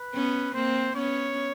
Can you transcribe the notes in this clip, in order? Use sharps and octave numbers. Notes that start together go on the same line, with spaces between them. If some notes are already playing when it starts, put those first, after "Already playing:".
Already playing: B4
B3 C#4
A#3 C4 C5
B3 C#4 C#5